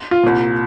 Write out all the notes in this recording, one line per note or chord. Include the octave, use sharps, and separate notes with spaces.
F4
C2 A#2